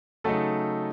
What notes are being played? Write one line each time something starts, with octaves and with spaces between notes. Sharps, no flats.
C#3 F#3 A3 D#4 A4